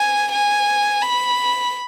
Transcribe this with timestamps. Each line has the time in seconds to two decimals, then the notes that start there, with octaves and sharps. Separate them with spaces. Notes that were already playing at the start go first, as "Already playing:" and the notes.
Already playing: G#5
0.32 G#5
1.01 B5